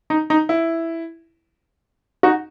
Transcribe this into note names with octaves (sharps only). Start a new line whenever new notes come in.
D#4
D#4
E4
D#4 F#4